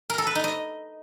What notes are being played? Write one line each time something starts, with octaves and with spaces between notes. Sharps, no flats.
A#4
A4
B4
D#4
D#5